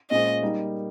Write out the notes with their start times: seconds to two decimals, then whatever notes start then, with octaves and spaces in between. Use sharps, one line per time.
0.10 A#2 G#3 C#4 G#4 C5 D#5
0.42 G3 A#3 D#4 A#4